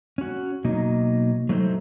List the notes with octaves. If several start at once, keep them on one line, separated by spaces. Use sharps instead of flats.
C#4 F#4
B2 F#3 A#3 D#4 D#5
F#3 A3 D#4 B4 C5